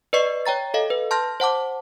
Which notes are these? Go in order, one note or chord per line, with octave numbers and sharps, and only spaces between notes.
B4 D5 D#5 C#6 C7
C#5 G5 A#5 A6
A4 D#5 F5
B4
A5 C6 F6 G6 A#6
C5 F#5 A5 D6